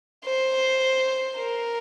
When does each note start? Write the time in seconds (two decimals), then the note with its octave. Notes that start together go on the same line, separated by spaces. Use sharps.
0.25 C5
1.37 A#4